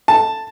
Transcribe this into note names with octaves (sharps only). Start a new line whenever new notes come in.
A5